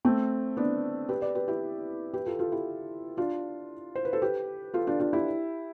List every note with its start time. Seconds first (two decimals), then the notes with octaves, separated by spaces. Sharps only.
0.05 A3 C4
0.57 B3 D4
1.09 G4 B4
1.22 B4 D5
1.35 G4 B4
1.48 E4 G4
2.14 G4 B4
2.26 F4 A4
2.39 F4 A4
2.52 E4 G4
3.17 D4 F4
3.95 C5
4.05 B4
4.13 A4 C5
4.22 G4 B4
4.74 F4 A4
4.87 D4 F4
5.00 D4 F4
5.13 E4 G4